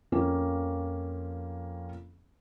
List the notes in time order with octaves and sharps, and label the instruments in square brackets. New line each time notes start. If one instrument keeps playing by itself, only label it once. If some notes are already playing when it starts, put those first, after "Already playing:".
[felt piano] F2 F3 A#3 C4 C#4